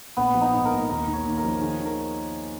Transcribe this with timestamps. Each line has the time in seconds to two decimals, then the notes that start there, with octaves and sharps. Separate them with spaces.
0.17 A#1 B3
0.35 F3
0.41 D#4
0.53 G#2
0.65 A#4
0.71 A#1
0.89 D#2 A#4
1.08 D#2
1.13 C#5
1.25 D#2
1.38 A#4
1.44 F3
1.61 D#3 G#4
1.80 D#3
1.86 A#4